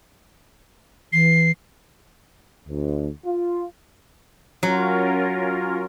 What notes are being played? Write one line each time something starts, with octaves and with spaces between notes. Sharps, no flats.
E3 C7
D2
F4
F#3 C#4 F4 A#4